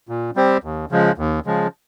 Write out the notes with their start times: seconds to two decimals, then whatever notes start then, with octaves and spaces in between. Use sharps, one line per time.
0.09 A#2
0.36 G3 C4 G4 C5
0.64 D#2
0.91 C#3 F3 G#3
1.18 D#2
1.46 C#3 F3 G#3